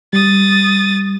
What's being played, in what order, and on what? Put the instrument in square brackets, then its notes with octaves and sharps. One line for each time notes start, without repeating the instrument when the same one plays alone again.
[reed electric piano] G3 [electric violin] D#6 A6